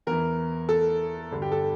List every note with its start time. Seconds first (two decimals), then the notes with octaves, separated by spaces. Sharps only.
0.07 E2 E3 A#4
0.69 A4
1.31 G2 D3
1.42 G4
1.52 A4